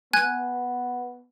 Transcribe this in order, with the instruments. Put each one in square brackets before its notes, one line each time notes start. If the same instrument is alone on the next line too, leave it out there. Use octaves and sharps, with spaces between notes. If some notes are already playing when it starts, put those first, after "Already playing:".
[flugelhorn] B3 [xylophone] G#5 F#6 G#6